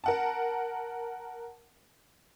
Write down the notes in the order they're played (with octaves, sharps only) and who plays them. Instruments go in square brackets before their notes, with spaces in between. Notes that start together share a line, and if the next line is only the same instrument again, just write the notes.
[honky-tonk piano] A#4 F#5 A5